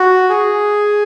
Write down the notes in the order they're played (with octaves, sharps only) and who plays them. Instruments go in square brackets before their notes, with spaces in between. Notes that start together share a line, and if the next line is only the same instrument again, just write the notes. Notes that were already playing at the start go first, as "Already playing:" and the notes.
Already playing: [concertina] F#4
G#4